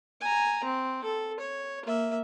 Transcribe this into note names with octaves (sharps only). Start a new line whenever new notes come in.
G#5 A#5
C4
A4
C#5
A#3 E5